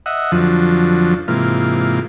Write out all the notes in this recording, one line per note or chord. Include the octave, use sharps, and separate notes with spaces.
D#5 E5 F#5
F2 D3 F3 F#3
G#2 C3 E3 A#3 F4